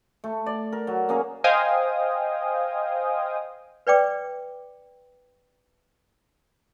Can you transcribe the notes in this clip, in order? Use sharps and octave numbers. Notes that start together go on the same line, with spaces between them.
A3
D5
A#4
F#3
A#3 C#4 G#4 A#4
C5 D#5 F5 G5 G#5 D#6
B4 D5 G5 D6